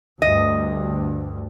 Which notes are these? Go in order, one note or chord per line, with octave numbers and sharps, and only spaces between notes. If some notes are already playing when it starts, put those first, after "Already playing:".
D2 G2 D#5